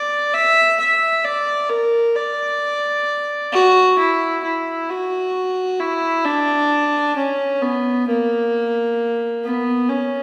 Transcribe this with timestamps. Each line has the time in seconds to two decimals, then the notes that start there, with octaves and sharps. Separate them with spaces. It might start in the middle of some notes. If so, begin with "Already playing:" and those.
Already playing: D5
0.34 E5
0.80 E5
1.24 D5
1.70 A#4
2.15 D5
3.52 F#4
3.98 E4
4.43 E4
4.88 F#4
5.80 E4
6.25 D4
7.16 C#4
7.61 B3
8.07 A#3
9.44 B3
9.89 C#4